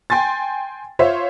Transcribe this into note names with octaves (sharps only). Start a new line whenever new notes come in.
G5 G#5 C6 A6
F4 C5 C#5 E5 F5